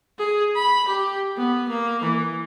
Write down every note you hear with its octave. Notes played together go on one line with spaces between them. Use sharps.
G#4
B5
G4
B3
A#3
E3